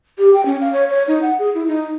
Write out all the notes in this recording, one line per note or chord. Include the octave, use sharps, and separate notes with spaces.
G4
G5
C#4
F5
C#5
C#5
D#4
F#5
G#4
E4
D#4